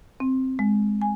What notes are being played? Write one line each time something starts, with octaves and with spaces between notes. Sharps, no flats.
C4
G#3
G#5